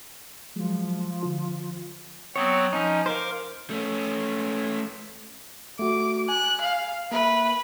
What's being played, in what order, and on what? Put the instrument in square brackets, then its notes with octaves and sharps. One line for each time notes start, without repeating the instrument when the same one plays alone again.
[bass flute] F3 [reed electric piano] F#3 G#3
[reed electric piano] D3 F4
[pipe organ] F#3 B3 C4 [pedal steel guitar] C#5
[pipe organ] F3 C#4 [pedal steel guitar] D#4
[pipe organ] A#4 D6 [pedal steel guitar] C5 F5
[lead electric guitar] A3 C#4
[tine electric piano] A3 F#4 [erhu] D6
[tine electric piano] G#5 [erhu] F#6
[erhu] F5
[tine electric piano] A#3 E5 [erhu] B4